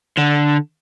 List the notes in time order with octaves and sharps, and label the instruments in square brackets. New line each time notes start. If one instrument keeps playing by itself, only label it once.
[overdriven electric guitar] D3